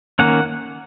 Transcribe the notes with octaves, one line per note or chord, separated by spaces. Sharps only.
D#3 A#3 C#4 F#5